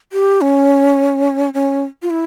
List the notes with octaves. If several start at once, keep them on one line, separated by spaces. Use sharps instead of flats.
G4
C#4
C#4
F4
E4